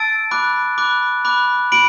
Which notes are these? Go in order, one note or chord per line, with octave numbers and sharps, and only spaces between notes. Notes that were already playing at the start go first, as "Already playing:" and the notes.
Already playing: A5 E6 A6 D7
B5 D6 F#6
B5 D6 F#6
B5 D6 F#6
B5 D7 F#7